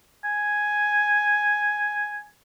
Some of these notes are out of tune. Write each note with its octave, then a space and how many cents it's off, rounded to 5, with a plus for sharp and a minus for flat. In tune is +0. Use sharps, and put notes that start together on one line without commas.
G#5 +5